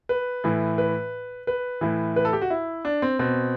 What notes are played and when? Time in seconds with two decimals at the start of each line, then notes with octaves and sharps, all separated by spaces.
0.09 B4
0.44 A2 E3
0.78 B4
1.47 B4
1.81 A2 E3
2.16 B4
2.25 A4
2.33 G4
2.42 F#4
2.50 E4
2.85 D4
3.02 C4
3.19 B2 C4